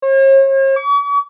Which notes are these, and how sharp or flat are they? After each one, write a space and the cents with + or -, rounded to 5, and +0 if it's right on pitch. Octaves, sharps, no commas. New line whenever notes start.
C#5 -45
C#6 +45